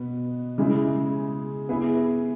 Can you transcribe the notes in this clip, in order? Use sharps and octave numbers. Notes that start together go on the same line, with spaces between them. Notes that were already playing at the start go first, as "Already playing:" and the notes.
Already playing: B2 B3
C#3 G#3 E4
B3 E4 G#4